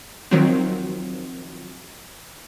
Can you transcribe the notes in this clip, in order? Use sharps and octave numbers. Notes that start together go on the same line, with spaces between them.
D#3 F3 F#3 C4